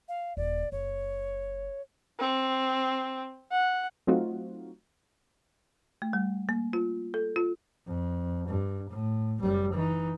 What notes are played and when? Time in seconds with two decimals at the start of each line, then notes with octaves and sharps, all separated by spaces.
0.09 F5
0.37 D#1 D5
0.72 F#1 C#5
2.19 C4
3.51 F#5
4.07 F#3 A3 C4 D#4 F4 F#4
6.02 A3
6.13 G3
6.49 A#3
6.73 F4
7.14 A4
7.36 F4
7.86 F2
8.48 G2
8.90 A2
9.41 F#1 G3
9.73 E3 D#4